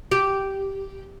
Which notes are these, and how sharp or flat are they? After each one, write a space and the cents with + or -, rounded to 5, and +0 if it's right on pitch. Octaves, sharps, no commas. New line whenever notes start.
G4 -10